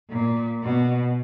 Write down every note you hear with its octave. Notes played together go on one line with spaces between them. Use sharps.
A#2
B2